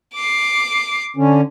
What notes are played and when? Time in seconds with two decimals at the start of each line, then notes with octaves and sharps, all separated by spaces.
0.15 D6 C7
1.17 D3 C#4